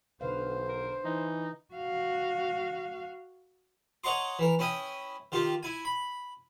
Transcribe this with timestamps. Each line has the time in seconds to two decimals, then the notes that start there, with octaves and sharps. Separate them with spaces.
0.21 B1 D3 B4 C5 F5
0.68 A#4
1.05 E3 D#4
1.75 F#4 F5
4.04 C#5 D#5 F#5 A#5 C6 D6
4.39 E3 A#4
4.59 C#4 E4 G5 D#6
5.32 D#3 F4 G4
5.63 E4 G#5
5.85 B5